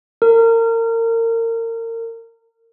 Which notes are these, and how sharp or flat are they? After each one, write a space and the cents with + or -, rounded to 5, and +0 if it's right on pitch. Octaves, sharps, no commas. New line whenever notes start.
A#4 -30